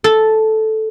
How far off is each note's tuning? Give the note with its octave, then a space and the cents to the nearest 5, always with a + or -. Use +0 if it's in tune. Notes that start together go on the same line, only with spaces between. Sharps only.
A4 -5